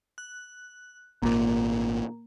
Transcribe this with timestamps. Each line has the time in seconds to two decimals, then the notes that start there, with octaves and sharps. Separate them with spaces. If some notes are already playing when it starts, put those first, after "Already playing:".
0.18 F#6
1.22 G#1 A#2 A#3